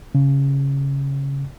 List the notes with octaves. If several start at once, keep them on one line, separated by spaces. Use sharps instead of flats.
C#3